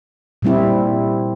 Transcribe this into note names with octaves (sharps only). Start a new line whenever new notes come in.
A#2 G3 C4 E4